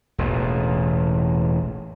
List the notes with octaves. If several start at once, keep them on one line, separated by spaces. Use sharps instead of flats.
E1 A1 A#2